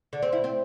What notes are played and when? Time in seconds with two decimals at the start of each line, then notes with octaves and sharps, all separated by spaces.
0.13 D3
0.22 C4
0.32 E4
0.44 C4